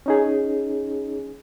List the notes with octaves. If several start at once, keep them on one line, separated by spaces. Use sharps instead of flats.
C#4 D#4 G#4